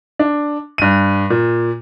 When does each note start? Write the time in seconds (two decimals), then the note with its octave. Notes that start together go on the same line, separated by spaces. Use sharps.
0.19 D4
0.78 G2 D#7
1.30 A#2